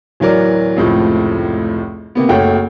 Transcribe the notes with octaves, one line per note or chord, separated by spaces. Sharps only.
D1 E3 F#3 A#4 D5
F1 C#2 A2 F3 A3
C3 A#3 B3
F#1 A3 F#4 C#5 F#5 G5